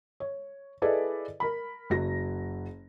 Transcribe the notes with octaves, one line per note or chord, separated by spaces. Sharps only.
C#5
E4 G#4 A4 B4 D5 D#5
A#4 B5
F#1 F#3 A#6